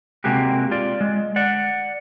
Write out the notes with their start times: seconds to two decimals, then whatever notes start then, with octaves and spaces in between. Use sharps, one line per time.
0.24 C3 G#3 A#3 F#4 G4
0.71 F4 D5
1.01 G#3
1.36 D5 F#5